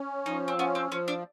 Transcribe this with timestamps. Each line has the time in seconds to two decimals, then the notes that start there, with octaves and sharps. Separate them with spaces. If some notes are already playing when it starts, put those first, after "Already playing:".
Already playing: C#4
0.26 F3 D#4
0.48 C4
0.58 B3 C#4
0.75 C4
0.91 F3 C#4
1.08 D4